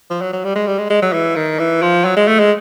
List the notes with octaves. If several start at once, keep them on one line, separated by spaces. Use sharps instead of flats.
F3
F#3
F#3
G3
G#3
G3
G#3
G#3
F#3
E3
D#3
E3
F3
F#3
G#3
A3
G#3